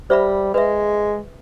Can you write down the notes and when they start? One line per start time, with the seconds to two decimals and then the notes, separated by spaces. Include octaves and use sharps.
0.10 G3 C5 E5 B5
0.54 G#3 B4 E5